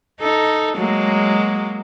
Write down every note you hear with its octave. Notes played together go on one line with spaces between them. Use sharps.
D#4 A4
F#3 G#3 A#3